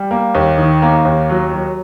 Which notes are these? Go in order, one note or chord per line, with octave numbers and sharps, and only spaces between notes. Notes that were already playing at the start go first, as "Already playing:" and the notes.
Already playing: G3
A#3
D#2
D#3
A#3
D#2
F#3
F#3